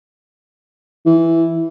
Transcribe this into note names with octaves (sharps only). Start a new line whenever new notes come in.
E3